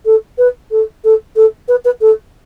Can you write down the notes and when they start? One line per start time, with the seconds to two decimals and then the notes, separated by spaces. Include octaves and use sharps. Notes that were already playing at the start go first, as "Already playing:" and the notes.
0.06 A4
0.38 B4
0.71 A4
1.04 A4
1.36 A4
1.68 B4
1.85 B4
2.01 A4